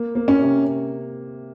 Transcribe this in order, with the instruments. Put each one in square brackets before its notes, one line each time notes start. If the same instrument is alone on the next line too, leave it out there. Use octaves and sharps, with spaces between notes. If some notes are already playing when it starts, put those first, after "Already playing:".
Already playing: [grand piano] A#3
A#3
[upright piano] C#4
[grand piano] C3